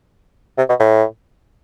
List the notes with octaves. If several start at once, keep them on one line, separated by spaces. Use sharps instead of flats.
C3
B2
A2